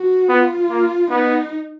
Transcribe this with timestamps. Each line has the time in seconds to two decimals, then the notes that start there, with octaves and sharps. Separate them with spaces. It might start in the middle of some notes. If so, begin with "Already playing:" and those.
Already playing: F#4
0.29 B3 F4
0.70 A#3
1.10 B3 D#4